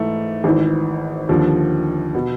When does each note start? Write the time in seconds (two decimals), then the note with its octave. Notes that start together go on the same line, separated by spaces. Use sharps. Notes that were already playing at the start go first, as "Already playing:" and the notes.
Already playing: G#2 E3 A3
0.44 G#1 G#2 E3
1.29 D#2 D3 F3
2.15 B2